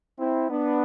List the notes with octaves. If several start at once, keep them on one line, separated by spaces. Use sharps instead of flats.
C4 E4
B3 D4